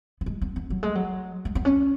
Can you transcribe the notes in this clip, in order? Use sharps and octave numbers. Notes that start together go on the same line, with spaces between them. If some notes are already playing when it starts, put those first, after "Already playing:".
B3
G#3
B3
B3
F#3
G#3
F#3
G#3
B3
C#4